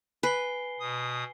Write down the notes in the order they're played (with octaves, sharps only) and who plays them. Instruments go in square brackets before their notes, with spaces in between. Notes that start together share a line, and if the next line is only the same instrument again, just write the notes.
[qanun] B4 [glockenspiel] G#5 C7 G7
[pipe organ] B2 D#6